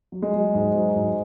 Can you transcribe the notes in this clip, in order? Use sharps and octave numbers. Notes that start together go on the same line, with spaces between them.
F#3
G#3
F#3
G#2
F#3
G#2